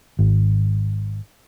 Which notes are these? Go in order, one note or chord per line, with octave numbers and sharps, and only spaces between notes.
G#1